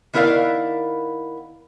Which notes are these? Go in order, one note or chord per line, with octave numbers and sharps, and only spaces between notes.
D#3 B3 E4 A#4 D5 F5